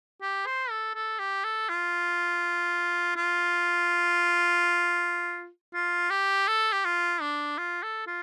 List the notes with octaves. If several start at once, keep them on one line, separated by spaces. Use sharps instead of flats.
G4
C5
A4
A4
G4
A4
F4
F4
F4
G4
A4
G4
F4
D4
F4
A4
F4